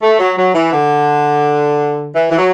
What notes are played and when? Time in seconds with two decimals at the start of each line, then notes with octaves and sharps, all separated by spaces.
0.02 A3
0.19 F#3
0.37 F#3
0.55 E3
0.73 D3
2.15 E3
2.31 E3
2.38 F#3